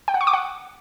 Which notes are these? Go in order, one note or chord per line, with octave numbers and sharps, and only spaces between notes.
G5
F#5
C#6
D6
F#5